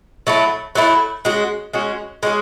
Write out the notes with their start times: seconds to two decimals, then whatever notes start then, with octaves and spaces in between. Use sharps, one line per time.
0.27 F#3 A3 E4
0.75 F#3 A3 E4
1.25 G#3 C#4 F#4
1.73 G#3 C#4 F#4
2.23 G#3 C#4 F#4